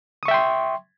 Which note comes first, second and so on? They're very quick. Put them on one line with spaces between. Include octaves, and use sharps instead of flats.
D#6 C#6 E5 G5 C6